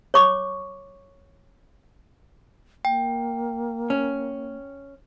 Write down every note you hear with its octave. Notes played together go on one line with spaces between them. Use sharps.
C#5 C#6 D6
A#3 G5
C#4